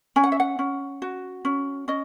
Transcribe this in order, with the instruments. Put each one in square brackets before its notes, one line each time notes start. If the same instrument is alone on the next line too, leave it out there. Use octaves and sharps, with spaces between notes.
[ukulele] C#4 G#5
F#5
E5
F#5
C#4
F#4
C#4
C#4 D#5